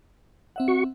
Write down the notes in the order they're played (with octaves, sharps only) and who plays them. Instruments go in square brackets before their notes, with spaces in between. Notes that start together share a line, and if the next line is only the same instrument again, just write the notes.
[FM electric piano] C4 E5 F#5
[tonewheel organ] F#4 C#6